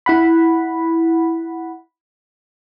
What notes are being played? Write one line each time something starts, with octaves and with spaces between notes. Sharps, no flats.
E4 F#5 B5